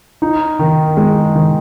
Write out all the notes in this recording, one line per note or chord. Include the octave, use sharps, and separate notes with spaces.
D#4
D#3
G#3
D#3